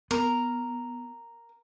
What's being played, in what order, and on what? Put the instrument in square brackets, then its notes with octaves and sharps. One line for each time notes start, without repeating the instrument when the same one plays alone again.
[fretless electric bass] B3 [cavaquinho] A#4